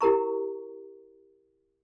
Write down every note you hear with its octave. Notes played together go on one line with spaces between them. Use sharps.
E4 G4 A#4 A#5 C#6